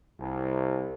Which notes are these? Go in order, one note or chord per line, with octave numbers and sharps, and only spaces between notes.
C2